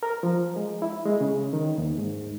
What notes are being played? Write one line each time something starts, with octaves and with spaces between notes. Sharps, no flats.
A#4
F3
G#3
E4
G#3
C#3
D#3
D#2
G#2